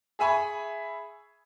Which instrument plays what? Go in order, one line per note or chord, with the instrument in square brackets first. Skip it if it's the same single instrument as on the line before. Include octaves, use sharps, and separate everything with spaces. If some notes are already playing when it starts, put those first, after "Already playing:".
[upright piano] G#4 E5 G#5 B5 C#6